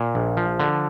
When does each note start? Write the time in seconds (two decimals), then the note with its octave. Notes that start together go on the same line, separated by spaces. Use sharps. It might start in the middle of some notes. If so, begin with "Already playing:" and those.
Already playing: A#2
0.15 A#1
0.37 F3
0.60 D3